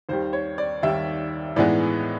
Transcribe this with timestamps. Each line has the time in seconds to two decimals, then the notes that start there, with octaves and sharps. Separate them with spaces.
0.09 D#2 D#3 G3 C5
0.33 C#5
0.58 D5
0.83 D#2 D#3 G3 E5
1.56 A2 E3 G#3 B3 D#4 D5